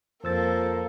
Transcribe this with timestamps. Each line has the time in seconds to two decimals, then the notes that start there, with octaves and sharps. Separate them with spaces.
0.24 F2 F3 A#3 A4 E6 A6